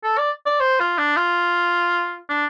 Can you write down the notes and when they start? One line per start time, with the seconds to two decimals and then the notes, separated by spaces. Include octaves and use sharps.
0.03 A4
0.18 D5
0.46 D5
0.60 C5
0.80 F4
0.98 D4
1.16 F4
2.29 D4